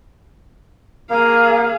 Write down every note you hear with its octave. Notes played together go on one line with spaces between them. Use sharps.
A#3 G#4 F5